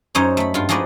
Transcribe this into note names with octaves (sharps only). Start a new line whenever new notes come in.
F#2 D#4 C5 C#5
A3 B5
G2 F4
F3 G#3 D#4 F#4 B4 D5